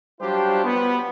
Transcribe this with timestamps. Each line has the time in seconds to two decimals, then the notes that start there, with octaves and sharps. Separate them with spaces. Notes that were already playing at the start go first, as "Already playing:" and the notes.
0.21 F#3 G3 D4 F4 G4 C5
0.65 B3